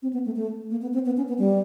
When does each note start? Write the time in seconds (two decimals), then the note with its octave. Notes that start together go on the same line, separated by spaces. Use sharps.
0.02 C4
0.13 B3
0.26 A3
0.36 A3
0.71 A#3
0.82 B3
0.94 C4
1.06 B3
1.17 C#4
1.28 B3
1.39 G3